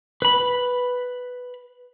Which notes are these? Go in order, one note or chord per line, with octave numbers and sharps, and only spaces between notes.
B4 B5